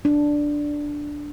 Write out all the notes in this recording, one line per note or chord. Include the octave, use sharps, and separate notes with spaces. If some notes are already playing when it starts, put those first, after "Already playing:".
D4